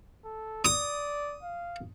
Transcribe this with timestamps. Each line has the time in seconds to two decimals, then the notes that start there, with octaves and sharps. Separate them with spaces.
0.25 A4
0.65 D5 D#6
1.43 F5